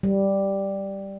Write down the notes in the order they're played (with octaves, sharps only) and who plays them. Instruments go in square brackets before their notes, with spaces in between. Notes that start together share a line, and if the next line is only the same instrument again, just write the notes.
[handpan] G3